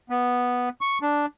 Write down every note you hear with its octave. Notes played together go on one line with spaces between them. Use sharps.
B3
C#6
D4